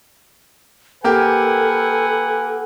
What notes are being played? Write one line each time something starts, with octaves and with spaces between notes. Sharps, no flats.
A#3 G4 A4 B4 F#5 G#5